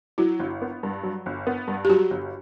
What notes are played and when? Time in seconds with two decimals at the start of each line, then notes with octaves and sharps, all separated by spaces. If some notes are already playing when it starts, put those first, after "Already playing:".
0.18 F#3 E4
0.39 G1
0.62 B3
0.83 G2
1.03 F#3
1.26 G1
1.47 B3
1.68 G2
1.85 G4
1.89 F#3 F#4
2.11 G1